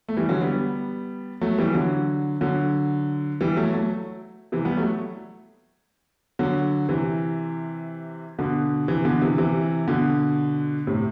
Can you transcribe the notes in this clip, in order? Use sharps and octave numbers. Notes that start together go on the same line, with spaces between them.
A3
E3 G3
D3 F#3
G3 B3
F#3 A3
E3 G3
D3 F#3
D3 F#3
E3 G3
F#3 A3
F#3 A3
C3 E3
G3 B3
F#3 A3
D3 F#3
C3 E3
B2 D3
C3 E3
B2 D3
C3 E3
C3 E3
B2 D3
A2 C3